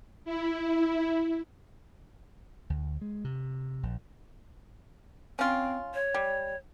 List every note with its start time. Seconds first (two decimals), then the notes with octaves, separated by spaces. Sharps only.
0.25 E4
2.70 D2
3.01 G#3
3.25 C3
3.83 A#1
5.39 C4 C#4 F4
5.94 C#5
6.14 G3